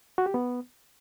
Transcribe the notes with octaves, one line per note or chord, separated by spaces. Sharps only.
F#4
G4
B3